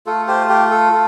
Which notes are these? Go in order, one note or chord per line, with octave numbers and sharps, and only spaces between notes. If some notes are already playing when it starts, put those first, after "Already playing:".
A3 F4 A4
G4 C5
G4
A4
A3 F4